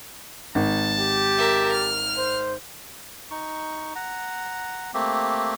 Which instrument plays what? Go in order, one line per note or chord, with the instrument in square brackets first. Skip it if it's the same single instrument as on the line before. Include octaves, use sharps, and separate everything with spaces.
[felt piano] G#1 [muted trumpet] A5
[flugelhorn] G4
[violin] A#4 E5
F6
[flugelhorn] C5
[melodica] D#4 C#6
F#5 A#5
A3 A#3 C4 G4